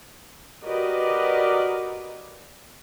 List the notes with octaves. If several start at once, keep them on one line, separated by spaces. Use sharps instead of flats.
F#4 G4 A#4 B4 D5 D#5